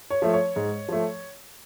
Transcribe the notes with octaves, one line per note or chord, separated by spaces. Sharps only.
C#5
F3 A3
C#5
G#2
F3 A3